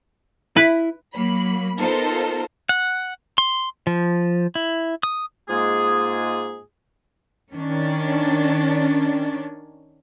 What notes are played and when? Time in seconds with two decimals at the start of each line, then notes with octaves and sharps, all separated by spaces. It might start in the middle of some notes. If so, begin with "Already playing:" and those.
0.56 E4 B4
1.14 F#3 A#3 B5
1.79 B3 D#4 F4 A4 A#4 C5
2.69 F#5
3.38 C6
3.87 F3
4.55 E4
5.03 D#6
5.49 G#2 G#3 A#3 F4 G#4
7.52 D#3 C#4 D4